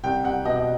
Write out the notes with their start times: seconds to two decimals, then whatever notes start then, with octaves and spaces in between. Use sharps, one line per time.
0.04 C2 G5
0.24 C2 F#5
0.45 B2 D#5
0.56 D#5